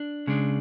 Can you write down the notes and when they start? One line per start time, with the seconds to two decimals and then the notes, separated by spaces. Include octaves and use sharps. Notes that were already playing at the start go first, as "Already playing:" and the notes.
Already playing: D4
0.27 C#3 G#3 D4